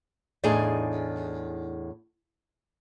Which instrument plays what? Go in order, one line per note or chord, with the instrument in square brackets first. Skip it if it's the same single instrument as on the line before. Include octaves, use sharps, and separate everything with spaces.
[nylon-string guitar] E2 A2 D4 D#4 G#4